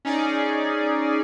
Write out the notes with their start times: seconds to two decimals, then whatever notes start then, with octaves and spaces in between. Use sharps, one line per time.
0.05 C#4 D#4 G#4 D5